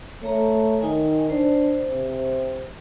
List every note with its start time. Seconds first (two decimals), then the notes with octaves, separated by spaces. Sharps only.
0.23 A3 C#5 A#5
0.82 D#3 D#4 G#5
1.30 D4 C5
1.90 C3